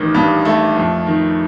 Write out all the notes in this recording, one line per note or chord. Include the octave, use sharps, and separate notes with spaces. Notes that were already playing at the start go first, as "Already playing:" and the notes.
Already playing: A1 D#3
G2
A3
F2
D#3